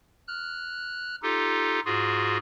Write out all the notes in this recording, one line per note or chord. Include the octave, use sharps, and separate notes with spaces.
F6 F#6
D#4 F4 G4 A4
G#2 F4 F#4 G#4